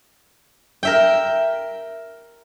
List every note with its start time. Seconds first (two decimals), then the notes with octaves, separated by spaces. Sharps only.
0.83 A#4 E5 G5